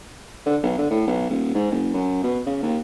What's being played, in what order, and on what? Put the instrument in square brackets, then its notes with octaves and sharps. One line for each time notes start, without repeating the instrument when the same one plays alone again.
[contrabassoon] D3
B1
D3
A2
B1
D#1
G#2
F#1
F#2
B2
C#3
D#2